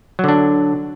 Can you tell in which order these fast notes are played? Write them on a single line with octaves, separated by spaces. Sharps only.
F#3 D3 D4